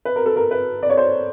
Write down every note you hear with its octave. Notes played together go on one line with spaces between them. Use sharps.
B4
A#4
A4
A#4
B4
D5
C#5
C5